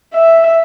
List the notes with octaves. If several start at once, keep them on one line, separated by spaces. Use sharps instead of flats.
E5